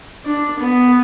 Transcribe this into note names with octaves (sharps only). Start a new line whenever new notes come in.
D4
B3